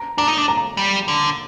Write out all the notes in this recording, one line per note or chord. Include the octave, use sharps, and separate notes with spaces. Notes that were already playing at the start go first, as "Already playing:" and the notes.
Already playing: A#5
D4 A#5
D#4
D4
A#5
G3
D3